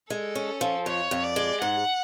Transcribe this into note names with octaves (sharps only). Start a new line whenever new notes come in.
G#3 A4
C#4
F3
F2 C#5
F2
D5
G#3
G#2 F#5